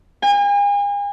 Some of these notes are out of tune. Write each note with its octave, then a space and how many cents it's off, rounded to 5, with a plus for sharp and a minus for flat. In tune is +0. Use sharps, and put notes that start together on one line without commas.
G#5 -40